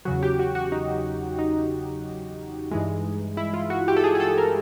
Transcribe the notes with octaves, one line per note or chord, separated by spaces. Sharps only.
E2 C#3 F#3 F#4
G4
F#4
F#4
D#4
D#4
G2 E3 G#3
E4
F4
F#4
G4
A4
G#4
G#4
A4
A#4